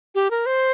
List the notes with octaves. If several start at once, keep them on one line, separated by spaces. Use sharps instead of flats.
G4
A#4
C5